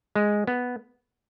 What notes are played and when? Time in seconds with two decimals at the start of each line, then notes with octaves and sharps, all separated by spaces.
0.16 G#3
0.47 B3